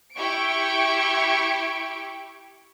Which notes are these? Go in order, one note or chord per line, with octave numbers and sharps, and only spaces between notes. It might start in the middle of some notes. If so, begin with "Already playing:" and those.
E4 G4 G5 C#6 D7